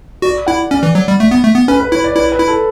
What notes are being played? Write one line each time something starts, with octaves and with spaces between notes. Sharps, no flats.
F#4 D5
E4 F#5
C#4 D5
E3
F#3
G3
A3
B3
A3
B3
C#4 B4
B4
E4 C#5
D5
E4 B4
B4
E4
A4